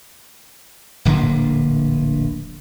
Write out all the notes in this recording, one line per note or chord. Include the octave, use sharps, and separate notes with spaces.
D1 A#1 D3 A#3